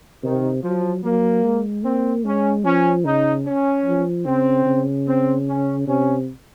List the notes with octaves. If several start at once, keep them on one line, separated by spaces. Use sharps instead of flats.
C3 D#3
F3 F#3
F#3 A#3
G#3
A#3 C4
G#3 C#4
F3 C#4
C#3 D#4
C#4
F3
C#3 C4
C#3
C4
C#4
C3 C#4